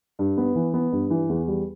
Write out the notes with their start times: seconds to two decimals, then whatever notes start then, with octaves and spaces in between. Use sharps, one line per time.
0.19 G2
0.37 B3
0.55 E3
0.74 B3
0.92 G2
1.10 E3
1.29 E2
1.48 G3